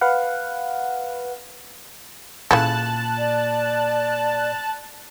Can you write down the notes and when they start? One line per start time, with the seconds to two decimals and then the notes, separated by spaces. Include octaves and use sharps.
0.01 B4 F5 F#5
2.51 A#2 C#3 E4 A4 A5 F#6
3.18 D5